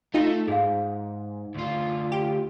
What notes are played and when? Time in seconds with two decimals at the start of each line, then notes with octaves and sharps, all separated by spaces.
0.14 A3 D#4 F4 G5
0.48 G#2 G#4 F5
1.54 D2 F4
2.12 G4